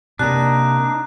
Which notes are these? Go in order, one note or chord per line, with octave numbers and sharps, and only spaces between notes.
C3 A#3 D4 D#4 F#6